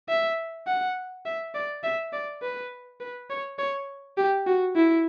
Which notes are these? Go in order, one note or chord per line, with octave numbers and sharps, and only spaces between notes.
E5
F#5
E5
D5
E5
D5
B4
B4
C#5
C#5
G4
F#4
E4